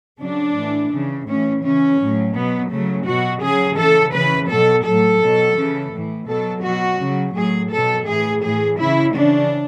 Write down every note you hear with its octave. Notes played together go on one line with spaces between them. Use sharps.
C#3 F#3 D4
A2 E3
C#3 E3
A2 E3 C#4
C#3 E3 C#4
A2 F#3
B2 F#3 B3
C#3 F#3 A3
B2 F#3 F#4
C#3 F#3 G#4
C#3 E3 A4
C#3 E3 B4
B2 F#3 A4
A2 F#3 A4
B2 F#3
C#3 E3
A2 E3
B2 F#3 A4
B2 F#3 F#4
C#3 F#3
A2 F#3 G#4
B2 F#3 A4
A2 E3 G#4
A2 E3 G#4
C#3 E3 E4
C#3 E3 D4